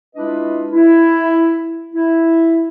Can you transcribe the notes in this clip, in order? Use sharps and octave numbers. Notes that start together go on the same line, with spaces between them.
G#3 D4 E4 F4 B4 D#5
E4
E4